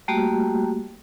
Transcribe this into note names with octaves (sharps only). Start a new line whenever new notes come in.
G3 A3 A#3 F#4 G4